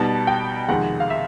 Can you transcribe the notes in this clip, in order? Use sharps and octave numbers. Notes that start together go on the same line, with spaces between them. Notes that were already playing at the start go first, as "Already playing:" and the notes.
Already playing: B2 G3 B3 D#4 A5
G5
F2 C3 D#3 G#3 F#5
F5
E5